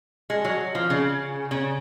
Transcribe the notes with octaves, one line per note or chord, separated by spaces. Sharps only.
G#3
F#3
F3
C#3
C#3